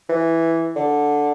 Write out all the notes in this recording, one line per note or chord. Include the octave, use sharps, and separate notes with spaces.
E3
D3